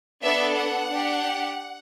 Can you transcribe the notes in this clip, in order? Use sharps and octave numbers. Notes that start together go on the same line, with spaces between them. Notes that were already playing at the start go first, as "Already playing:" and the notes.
B3 D4 A4 E5
F#5
D4 G4